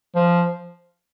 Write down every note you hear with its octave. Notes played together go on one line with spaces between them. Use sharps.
F3